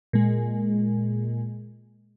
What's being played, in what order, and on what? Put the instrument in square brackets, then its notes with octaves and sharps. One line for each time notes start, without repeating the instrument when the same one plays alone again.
[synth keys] A#2 G#3